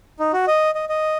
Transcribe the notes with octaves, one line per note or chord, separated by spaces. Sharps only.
D#4
F#4
D#5
D#5
D#5